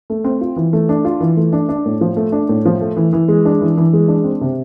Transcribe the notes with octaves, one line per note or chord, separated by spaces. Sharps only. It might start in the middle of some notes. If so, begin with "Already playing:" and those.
A3
C4
F4
E3
A3
D4
F4
E3
A3
D4
D4
A2
F3
A3
D4
A2
F3
A3
E3
E3
G#3
D4
E3
E3
G#3
D4
C4
C3